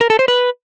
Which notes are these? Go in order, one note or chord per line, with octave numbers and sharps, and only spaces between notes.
A#4
A4
C5
B4